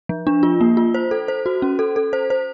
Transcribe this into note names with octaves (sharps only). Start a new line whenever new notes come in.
F3
D4
F4
A#3
F4
C5
A4
C5
F#4
C#4
A4
A4
C5
C5